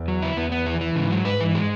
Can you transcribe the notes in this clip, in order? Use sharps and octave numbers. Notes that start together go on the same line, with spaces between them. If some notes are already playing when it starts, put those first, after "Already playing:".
Already playing: E2
F#3
E4
E2 B3
B3
E3
E3
G#2 C#3
F#3
B4
E3
G#3